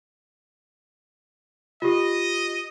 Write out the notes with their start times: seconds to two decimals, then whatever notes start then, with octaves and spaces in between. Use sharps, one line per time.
1.82 F4 G4 D#5